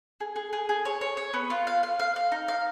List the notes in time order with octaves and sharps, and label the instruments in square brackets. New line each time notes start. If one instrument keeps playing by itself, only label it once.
[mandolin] G#4
G#4
G#4
G#4
C#5
C#5
C#5
B3
F4
F5
F5
F5
F5
D#4
F5